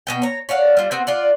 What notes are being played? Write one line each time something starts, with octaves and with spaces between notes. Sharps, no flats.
B2 B3 G5
C#5 A#5
C#5 D5 F5 F#5
G3 F4
B3 C4 F#4
F4 D5 F#5